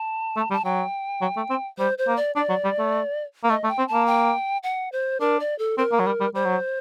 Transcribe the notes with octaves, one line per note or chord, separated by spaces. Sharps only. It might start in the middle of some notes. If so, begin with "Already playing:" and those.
Already playing: A5
A3
G3 A5
F#3 G5
F#3
A3
C4
G3 C5
C5
A#3
D5
D4 D5
F#3
G3
A3
A#3
A3 D#5
A3
G5
C4
A#3 A5
G5
F#5
C5
D4 A#4
D5
A4
C4 A#4
A#3
F#3
G3
G3
G3 C5
F#3